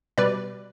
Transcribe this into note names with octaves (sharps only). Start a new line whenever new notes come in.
B2 G3 B4 D5